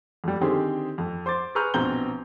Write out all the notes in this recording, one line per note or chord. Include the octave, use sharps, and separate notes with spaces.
F2 G3
D3 D#3 C4 G4 G#4 C5
F2
C5 C6 D6 A6
G#4 B4 A#5 C#6 F6 G6
A#1 B2 C4 A#5 G6 G7